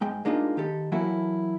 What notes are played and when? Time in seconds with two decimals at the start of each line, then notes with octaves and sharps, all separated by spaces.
0.01 G#2 G#3 G5
0.25 G#3 A#3 D4 D#4 F4
0.57 D#3 G4 A4
0.92 E3 F#3 A#3 E4 F#4 A4